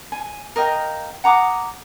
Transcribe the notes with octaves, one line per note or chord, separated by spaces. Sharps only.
G#5
A#4 D#5 F5 G5
F#5 A#5 D6 D#6